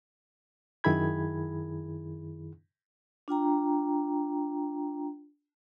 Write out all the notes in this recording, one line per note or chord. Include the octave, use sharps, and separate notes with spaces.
F#2 D#3 E4 G#4 B5 G#6
D4 F4 G5 A#5